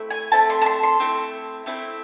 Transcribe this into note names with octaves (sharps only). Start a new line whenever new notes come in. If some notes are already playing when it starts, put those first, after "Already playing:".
Already playing: A3 C4 E4
G#5
A3 C4 E4 A5
C6
A5
C6
C6
A3 C4 E4
A3 C4 E4